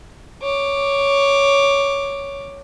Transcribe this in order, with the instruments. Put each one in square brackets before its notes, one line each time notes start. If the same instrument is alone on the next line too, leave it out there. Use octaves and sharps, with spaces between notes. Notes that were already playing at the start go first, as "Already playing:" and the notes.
[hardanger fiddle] C#5 D6